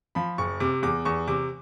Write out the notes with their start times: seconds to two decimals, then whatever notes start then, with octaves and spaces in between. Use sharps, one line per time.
0.15 F3 B5
0.38 F#1 C#6
0.60 C3 D6
0.83 E2 D6
1.05 E2 C#6
1.28 C3 D6